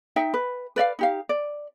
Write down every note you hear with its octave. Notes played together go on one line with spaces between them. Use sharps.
D#4 E5 G5
B4
B4 D5 E5 F5
D#4 G4 F5
D5